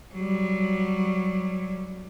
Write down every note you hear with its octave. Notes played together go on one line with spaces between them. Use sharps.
F#3 G3